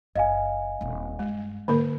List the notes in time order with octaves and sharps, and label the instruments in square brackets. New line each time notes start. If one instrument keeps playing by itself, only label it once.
[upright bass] F#1 [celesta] D#5 F5 G#5
[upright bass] D#1 C4
[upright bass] G2 [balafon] G#3
[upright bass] G#2 [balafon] D3 A#3 A#4